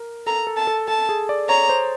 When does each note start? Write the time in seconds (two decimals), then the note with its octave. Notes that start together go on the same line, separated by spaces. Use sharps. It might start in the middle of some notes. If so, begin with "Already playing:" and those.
Already playing: A#4
0.27 A4 A#5
0.47 A4
0.57 A5
0.67 A4
0.88 A4 A5
1.09 G#4
1.29 D5
1.49 C#5 A#5
1.69 C5